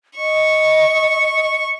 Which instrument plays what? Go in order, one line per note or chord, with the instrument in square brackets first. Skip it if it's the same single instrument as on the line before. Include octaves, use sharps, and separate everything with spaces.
[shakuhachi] D#5 [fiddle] C#6